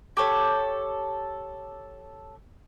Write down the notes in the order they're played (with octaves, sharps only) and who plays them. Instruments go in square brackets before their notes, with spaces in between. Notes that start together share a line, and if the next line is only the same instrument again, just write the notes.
[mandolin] G4 A4 C#5